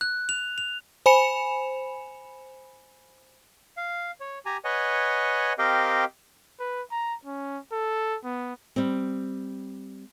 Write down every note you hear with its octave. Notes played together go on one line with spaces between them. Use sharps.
F#6
F7
F7
C5 G#5 B5 C#7 E7 F7
F5
C#5
G4 G#5 A#5
B4 C#5 D#5 F#5 G#5
C4 G4 A#4 D#5 F5 G5
B4
A#5
C#4
A4
B3
G3 C4